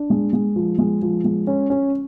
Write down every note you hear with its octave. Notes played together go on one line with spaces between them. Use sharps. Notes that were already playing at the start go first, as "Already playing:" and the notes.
Already playing: D4
G#3
G#3
F3
G#3
F3
G#3
C#4
C#4